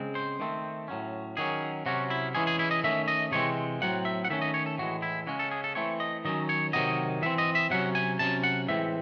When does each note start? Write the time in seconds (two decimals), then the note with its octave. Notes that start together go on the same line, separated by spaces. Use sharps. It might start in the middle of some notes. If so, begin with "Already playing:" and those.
Already playing: C#3 G#3 C4
0.15 C5
0.40 D#3 A3 C4
0.88 A2 F#3 C#4
1.37 D#3 F#3 C#4 G#4
1.86 C3 F#3 C#4 F#4
2.10 E4
2.35 E3 G#3 C#4 G#4
2.47 G#4
2.59 E4
2.71 D#5
2.83 D#3 A3 C#4 E5
3.08 D#5
3.32 C3 E3 G#3 C4 C#5
3.81 A2 F#3 C4 F#5
4.05 E5
4.25 F#5
4.30 D#3 A3 C#4 E5
4.42 D#5
4.54 C#5
4.66 A4
4.78 A2 E3 G#3 F#4
5.02 E4
5.27 C#3 G#3 C#4 F#4
5.39 A4
5.51 G#4
5.64 A4
5.75 E3 A3 C4 C#5
6.00 D#5
6.25 D#3 F#3 C#4 D#5
6.49 C#5
6.73 C3 D#3 F#3 D#5
7.22 E3 C4 E5
7.38 D#5
7.55 E5
7.70 C3 F#3 C#4 F#5
7.95 G#5
8.19 C3 F#3 C#4 A5
8.44 F#5
8.68 A2 E3 G#3 C4 E5